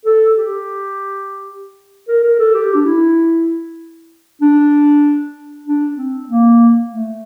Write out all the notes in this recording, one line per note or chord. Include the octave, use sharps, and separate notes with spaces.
A4
G4
A#4
A#4
A4
G4
D4
E4
D4
D4
C4
A#3
A3